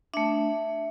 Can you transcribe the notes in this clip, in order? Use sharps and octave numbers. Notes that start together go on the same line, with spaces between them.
A3 D4 E5